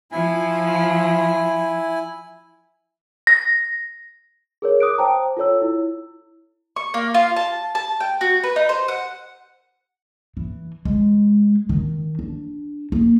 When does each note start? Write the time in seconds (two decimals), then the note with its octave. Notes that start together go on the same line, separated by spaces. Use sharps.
0.12 F3 E4 G#5
3.27 A#6
4.62 G#4 A#4 C#5
4.80 D6 D#6 F#6 D7
4.98 C5 G5 A5 A#5
5.37 F4 A4 C#5 E6
5.62 E4
6.76 C#6
6.94 A#3
7.14 F4
7.36 A5
7.75 A5
8.00 G5
8.21 F#4
8.43 B4
8.56 D#4
8.69 C5
8.88 F#5
10.37 E3
10.85 G#3
11.69 D#3
12.19 D4
12.92 A#3